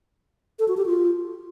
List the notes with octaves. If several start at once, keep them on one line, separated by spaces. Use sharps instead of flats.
A4
F#4
G4
F4